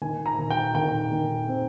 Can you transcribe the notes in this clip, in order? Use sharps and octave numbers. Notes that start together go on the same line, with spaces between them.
D#3 G#5
A#5
D#3
G5
D#3 G5
D#3
C4